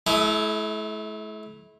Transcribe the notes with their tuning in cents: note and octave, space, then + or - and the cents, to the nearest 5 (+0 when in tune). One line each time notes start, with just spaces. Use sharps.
A3 -40 E4 +0 D#6 +0